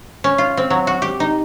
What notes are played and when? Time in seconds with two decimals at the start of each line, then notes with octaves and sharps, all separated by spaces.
0.24 C#4
0.38 F4
0.57 C4
0.70 F#3
0.87 F#4
1.02 G4
1.20 D#4